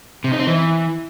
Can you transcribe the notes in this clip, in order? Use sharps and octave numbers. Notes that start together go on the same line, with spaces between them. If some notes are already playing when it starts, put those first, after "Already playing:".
C3
D#4
C4
E3